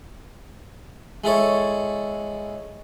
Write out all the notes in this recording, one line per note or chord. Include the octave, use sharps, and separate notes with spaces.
G#3 E4 A4 C#5